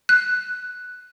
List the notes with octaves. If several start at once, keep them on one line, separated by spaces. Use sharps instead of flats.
F#6